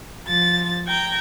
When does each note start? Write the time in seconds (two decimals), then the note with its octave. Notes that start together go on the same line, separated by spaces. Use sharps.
0.25 F3 A6
0.88 G5 A#5 G#6